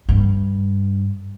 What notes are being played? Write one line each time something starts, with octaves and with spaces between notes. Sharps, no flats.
G2